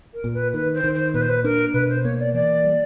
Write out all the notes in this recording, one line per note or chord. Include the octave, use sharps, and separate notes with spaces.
A#4
A#2
B4
D#3 B4
C5
D#3
C5
A#2 B4
C5
B4
D4 A#4
B2 B4
C5
A#3 C#5
D5
E3 D5
G3